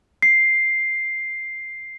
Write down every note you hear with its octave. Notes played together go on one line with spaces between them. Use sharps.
C7